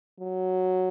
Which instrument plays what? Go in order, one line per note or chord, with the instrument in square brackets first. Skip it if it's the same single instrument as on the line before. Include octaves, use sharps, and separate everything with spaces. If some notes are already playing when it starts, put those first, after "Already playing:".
[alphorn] F#3